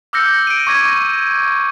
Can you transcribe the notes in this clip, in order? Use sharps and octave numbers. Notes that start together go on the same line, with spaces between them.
D6 E6 F6 G6 A#6 C#7
D7 D#7
C#6 D6 G#6 A#6 D#7